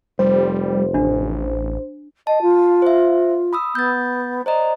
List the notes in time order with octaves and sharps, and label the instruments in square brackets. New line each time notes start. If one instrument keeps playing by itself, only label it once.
[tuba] F1 [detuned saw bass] G3 [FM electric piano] C5
[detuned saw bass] A1 [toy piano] D4
[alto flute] D#5 [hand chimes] A5
[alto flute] F4
[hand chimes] C5 E5
B5 D#6 E6
[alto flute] B3 [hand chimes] G6 A6
[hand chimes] C5 D5 D#5 [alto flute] A#5